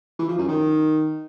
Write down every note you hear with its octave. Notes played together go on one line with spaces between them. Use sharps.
E3
F3
F#2
D#3